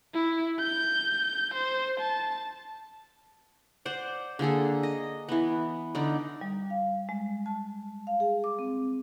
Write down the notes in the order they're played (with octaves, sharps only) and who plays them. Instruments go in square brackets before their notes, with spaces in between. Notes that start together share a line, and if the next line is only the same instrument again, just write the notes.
[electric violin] E4
G6
C5
A5
[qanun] C5 D5 F#5
D3 A#3 G#4 A4
D#5
E3 B3
D3 D#4 D5
[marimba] G3
F5
G#3
A5
F5
G#4
D6
C4